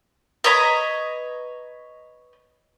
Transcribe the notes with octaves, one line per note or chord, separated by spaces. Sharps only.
B4 C#5 D#5 A#5